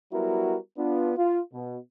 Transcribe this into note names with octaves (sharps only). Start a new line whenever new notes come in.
F#3 G3 B3 E4 F#4 A#4
B3 D4 F4
F4
B2